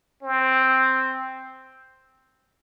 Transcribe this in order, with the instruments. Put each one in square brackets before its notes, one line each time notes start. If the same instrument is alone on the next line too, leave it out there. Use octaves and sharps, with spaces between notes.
[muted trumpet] C4